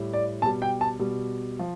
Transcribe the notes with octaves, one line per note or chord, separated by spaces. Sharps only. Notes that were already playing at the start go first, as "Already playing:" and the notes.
Already playing: A2 G3
D5
B2 G3 A5
G5
A5
B2 G3
F3